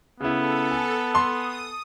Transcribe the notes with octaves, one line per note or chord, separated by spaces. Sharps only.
C#3 B3 E4 A4
G#5
C6 D#6